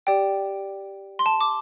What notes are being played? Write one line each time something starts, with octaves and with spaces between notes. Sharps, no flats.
G4 D5 G5
C6
A5
D6